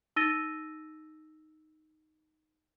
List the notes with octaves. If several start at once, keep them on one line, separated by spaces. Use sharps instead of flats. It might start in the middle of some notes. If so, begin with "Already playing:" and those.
D#4 E6 A6 A#6 D#7 G7